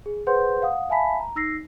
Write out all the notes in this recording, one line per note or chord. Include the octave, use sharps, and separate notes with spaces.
G#4
G#4 B4 C5 F#5 C6 G6
F5 F#5 D#6
E5 F5 G#5 A5 B5 B6
A#5
D#4 E6 A#6 C7